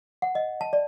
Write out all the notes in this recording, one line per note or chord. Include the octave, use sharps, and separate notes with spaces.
F#5
D#5
A5
D5